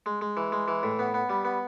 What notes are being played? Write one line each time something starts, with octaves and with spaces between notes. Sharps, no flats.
G#3
G#3
E3
G#3
E3
A2
B3
B3
G3
B3